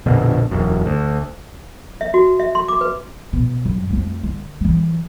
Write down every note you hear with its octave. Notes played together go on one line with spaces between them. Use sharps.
A#1 F2 B2 D3
E1 F#2
D2
E5
F#4
E5
C6
D6
B4
B2
F#2
F2 A3
D3
E3 F#3